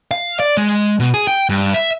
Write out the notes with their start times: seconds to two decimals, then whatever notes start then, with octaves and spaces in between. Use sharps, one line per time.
0.11 F5
0.40 D5
0.57 G#3
1.00 B2
1.14 G#4
1.27 G5
1.49 G2
1.74 E5